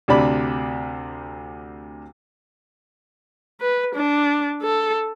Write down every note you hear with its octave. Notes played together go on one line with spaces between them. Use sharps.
D2 C3 D4 D5 B5
B4
D4
A4